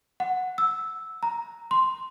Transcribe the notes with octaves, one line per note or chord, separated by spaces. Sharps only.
F#5
E6
A#5
C6